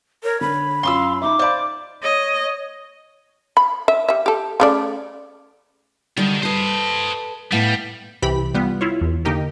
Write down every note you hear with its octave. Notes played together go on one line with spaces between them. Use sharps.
A#4 C#5
D3 B5
F#2 F4 F5 C6 D6 E6
D#4 E5 D6
C5 D5 F5 B5
C#5 D#5
B5
E5
G3 E5
G4 A4
C#3 A3 D5
D3 D#3 G3
A4 B4 C5 D#5
A2 G3 B3 F5
C2 C3 E3 G4 B5
G3 B3 F4
E4 F4 C#5
E2
D3 A#3 D#4 G4 A#4